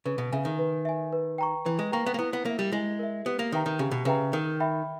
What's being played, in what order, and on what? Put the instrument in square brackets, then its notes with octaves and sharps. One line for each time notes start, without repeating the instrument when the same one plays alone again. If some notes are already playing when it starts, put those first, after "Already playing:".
[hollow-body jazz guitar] C#3 [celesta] B4
[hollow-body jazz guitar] B2
[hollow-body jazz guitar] C#3 [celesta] E5 G#5
[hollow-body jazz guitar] D#3
[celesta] B4
E5 G#5
B4
G5 A#5 C#6
[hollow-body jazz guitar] E3 [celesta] B4
[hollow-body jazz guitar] G#3
[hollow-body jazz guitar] A#3 [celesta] G5 A#5 C#6
[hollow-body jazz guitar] B3
A#3
[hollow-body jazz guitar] B3 [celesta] E4
[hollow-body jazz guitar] B3
[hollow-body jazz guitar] A#3 [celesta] A#4 E5
[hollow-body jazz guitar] G3
[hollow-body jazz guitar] G#3 [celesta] E4
[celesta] A#4 E5
[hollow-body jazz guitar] B3 [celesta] G4
[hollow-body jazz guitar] A#3
[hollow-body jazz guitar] D#3 [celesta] B4 E5 G5 A#5
[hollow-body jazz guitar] D#3
[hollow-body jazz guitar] C#3 [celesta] G4
[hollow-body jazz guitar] B2
[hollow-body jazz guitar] C#3 [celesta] B4 E5 G5 A#5
[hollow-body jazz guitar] D#3 [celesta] A#4
[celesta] E5 G5 B5